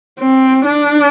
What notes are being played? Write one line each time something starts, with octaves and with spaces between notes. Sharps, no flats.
C4
D4